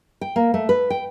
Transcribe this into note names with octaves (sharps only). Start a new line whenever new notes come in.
G5
A#3
A3
B4
G5